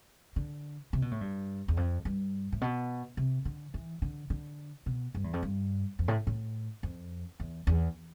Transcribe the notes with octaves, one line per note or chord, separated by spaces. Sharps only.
D3
C3
B2
A2
G2
E2
F2
G2
A2
B2
C3
D3
E3
D3
D3
B2
G2
E2
F2
G2
F2
A2
A2
F2
E2
E2